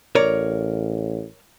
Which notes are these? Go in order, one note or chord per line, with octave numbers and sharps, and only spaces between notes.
A1 A#4 C#5 D5